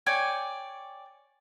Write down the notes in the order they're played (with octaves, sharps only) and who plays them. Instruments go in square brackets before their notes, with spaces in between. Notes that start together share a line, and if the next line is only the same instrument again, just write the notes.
[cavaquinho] C#5 D5 G5 G#5